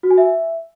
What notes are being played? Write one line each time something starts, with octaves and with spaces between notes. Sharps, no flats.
F#4
G#5
E5